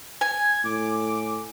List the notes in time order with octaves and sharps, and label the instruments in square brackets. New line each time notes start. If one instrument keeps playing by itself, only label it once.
[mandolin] G#5 [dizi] G#6
[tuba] A2 [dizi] D6